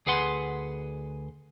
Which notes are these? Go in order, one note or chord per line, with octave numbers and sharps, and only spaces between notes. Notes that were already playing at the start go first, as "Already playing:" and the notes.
D2 G#4 B4 F#5 C6